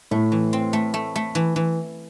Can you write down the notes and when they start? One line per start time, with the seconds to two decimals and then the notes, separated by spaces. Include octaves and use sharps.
0.11 A2 A3
0.32 E3
0.53 C4
0.73 A3
0.94 A3
1.16 A3
1.35 E3
1.56 E3